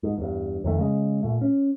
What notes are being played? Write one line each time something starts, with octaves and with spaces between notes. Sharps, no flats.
G#2
E2 G2
F2 D#3 A3
C#3 G#3
A#2 A3
C#4